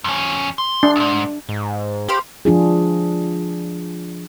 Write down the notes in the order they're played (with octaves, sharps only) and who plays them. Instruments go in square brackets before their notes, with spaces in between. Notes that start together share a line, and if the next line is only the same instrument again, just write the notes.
[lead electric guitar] F2 C#4
C6
[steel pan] D4
[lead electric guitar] C#2 G#2
[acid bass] G#2
[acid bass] G4 [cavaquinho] C5 F5 B5
[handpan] F3 D4 F4 G#4